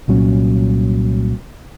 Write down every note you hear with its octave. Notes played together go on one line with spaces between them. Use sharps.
C2 A#2 F#3 C#4